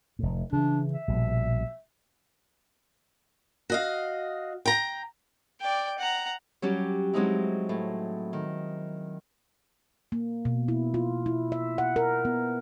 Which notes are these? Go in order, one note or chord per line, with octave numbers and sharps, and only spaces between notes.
F1 A2
C#3 E3 D4
E5
A#1 B2 G3
F#4 D#5 F5
G5 A#5
D5 G5
F#5 A#5
F#3 G3 C#4 G4
F#3 G#3 C4 D#4 E4
A2
D#3
A#3
B2
E4
F4
E4
E5
F#5
A#4
B3